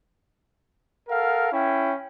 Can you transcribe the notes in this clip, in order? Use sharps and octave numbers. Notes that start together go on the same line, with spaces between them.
A4 A#4 F5 F#5
C#4 E4 G5